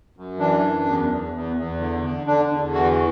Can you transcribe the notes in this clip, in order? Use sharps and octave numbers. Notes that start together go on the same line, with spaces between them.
F#2
E3 D4
F#2
E2
E2
E2
E2
D3
D3
D3 D4
E2
E3 F#4